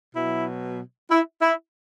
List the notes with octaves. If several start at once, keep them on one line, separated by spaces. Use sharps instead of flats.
B2 F#3 E4
E4
E4